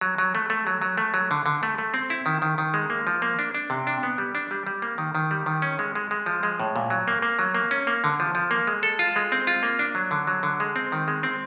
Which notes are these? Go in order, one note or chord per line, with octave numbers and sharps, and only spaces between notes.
F#3
F#3
A3
A3
F#3
F#3
A3
F#3
D3
D3
A3
A3
C4
E4
D#3
D#3
D#3
G#3
A#3
F3
A#3
D4
D4
C3
D4
B3
G3
D4
G3
G3
A#3
D#3
D#3
G3
D#3
C#4
G#3
G#3
G#3
F3
G#3
A2
A#2
F#3
A#3
A#3
F#3
A#3
C#4
A#3
D3
F3
F3
A#3
G#3
A4
F4
G#3
C4
F4
A#3
D4
F#3
D3
F#3
D3
G#3
C4
D#3
G#3
C4